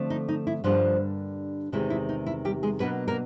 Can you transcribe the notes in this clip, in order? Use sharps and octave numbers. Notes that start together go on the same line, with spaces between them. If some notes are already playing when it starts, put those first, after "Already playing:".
Already playing: D3 F3 A3 C4
D#4
D#4
E4
G2 D3 F3 G3 A#3 D4 F4
E2 C3 D#3 G#3 E4
E4
D#4
E4
G3 G4
G#3 G#4
B2 F#3 A#3 B3 D4 B4
A#3 A#4